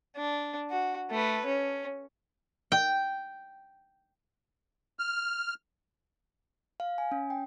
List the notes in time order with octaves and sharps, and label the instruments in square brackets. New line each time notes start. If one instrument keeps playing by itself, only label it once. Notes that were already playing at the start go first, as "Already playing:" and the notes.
[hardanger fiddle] D4
F#4
A3 B4
C#4
[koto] G5
[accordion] F6
[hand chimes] F5
G#5
C#4
G5